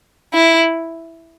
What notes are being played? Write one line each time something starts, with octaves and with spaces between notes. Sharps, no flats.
E4